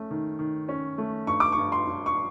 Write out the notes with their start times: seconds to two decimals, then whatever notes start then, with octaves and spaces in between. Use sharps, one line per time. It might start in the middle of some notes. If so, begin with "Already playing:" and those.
Already playing: A3 C#4
0.11 D#3
0.39 D#3
0.69 C#4
0.98 A3
1.27 G2 C#6
1.40 D6
1.52 C#6
1.58 G2
1.72 C6
1.87 G2
2.06 C#6